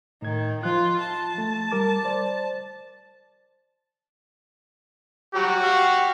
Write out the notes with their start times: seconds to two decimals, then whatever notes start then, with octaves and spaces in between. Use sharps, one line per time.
0.22 A2 D#3 G#6
0.63 F3 F4 F#6
1.00 A5
1.38 A3
1.72 G3 A#4 D6
2.05 C5 D5
5.35 F#3 G3 F#4 G4
5.64 G4 F5